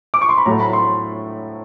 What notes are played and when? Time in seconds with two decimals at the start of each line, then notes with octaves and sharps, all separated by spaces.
0.14 D6
0.22 C#6
0.29 C6
0.38 B5
0.46 A2 F#3 A3 A#5
0.60 B5
0.73 C6